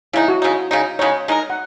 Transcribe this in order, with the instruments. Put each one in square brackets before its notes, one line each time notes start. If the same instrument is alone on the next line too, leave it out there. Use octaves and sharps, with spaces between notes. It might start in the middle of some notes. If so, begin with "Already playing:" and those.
[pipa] C#3 G#3 D#4 [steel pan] E4
[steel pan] F#4
[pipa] C#3 G#3 D#4
C#3 G#3 D#4
[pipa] C#3 G#3 D#4 [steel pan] C#5
[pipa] G#3 D#4 F#4 A#4
[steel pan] F#5